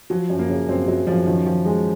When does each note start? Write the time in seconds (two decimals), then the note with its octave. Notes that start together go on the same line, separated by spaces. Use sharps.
0.10 F3 F#3
0.30 F#2
0.39 A#3
0.49 C#3
0.69 F#2 C4
0.88 F#2 F#3
1.07 F#2 F3
1.27 D#3 F3
1.46 F3
1.65 G#3